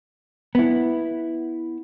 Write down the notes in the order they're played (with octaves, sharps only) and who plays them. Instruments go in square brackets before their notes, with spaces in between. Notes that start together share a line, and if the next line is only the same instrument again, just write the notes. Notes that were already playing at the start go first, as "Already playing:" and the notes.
[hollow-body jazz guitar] B3 E4